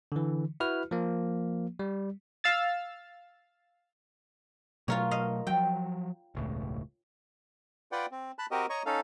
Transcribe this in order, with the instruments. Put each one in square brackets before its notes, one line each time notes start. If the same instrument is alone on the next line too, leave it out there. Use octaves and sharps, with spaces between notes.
[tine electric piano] D3 E3
E4 F#4 B4 F6
F3 A#3
G3
[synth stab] F5 E6 A6
[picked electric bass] B2 F#3 A3 [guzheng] F4 A#4 C#5
[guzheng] D#5 F5
[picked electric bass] F3 F#3 [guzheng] G5
[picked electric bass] E1 C#2 A2
[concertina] F4 B4 D5 F#5 G5
C4
A5 B5 F#6
C4 F#4 G4 A#4 D#5
C#5 D#5 A#5 C#6
C#4 D#4 A4 F5